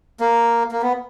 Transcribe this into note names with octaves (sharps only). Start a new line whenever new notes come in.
A#3
A#3
B3